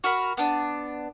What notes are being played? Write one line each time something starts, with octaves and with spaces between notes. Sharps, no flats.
F#4 A#4 B5
B3 D4